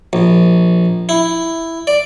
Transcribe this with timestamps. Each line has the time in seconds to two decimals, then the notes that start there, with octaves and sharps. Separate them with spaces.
0.13 A#1
1.09 E4
1.87 D5